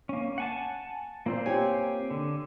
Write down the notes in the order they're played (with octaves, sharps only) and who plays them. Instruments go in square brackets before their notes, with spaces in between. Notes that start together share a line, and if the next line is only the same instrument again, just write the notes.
[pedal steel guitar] A#3 C#4
F#5 G#5 A5
[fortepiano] A#2 [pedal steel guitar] A#3 C4 C5
[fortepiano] G4 C#5 G#5
[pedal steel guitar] D3